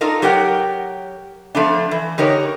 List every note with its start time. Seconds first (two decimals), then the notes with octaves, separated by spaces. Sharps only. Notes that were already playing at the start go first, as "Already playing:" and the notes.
0.01 D4 D#4 F4 A4 A#4
0.22 F#3 G4 A#4 F#5 G5
1.55 F3 A3 B3 D4
1.91 E3
2.18 D3 D#4 G4 A#4 C#5